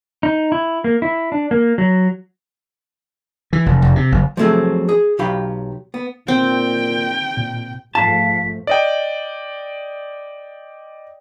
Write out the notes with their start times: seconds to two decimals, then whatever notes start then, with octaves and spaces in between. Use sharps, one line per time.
0.23 D#4
0.52 E4
0.84 A#3
1.02 E4
1.32 D4
1.51 A#3
1.78 F#3
3.53 E3
3.66 F1
3.82 F1
3.96 C3
4.12 F#1
4.37 F3 F#3 A3 C4 G#4
4.89 G#4
5.19 B1 F#3 G4 F5 B5
5.94 B3
6.28 A#2 C4 G5
7.37 A#2
7.95 G#2 F3 A3 F5 A5 B6
8.67 D5 D#5 G5